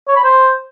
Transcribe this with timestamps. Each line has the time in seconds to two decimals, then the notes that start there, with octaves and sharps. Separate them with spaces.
0.08 C#5
0.16 B5
0.24 C5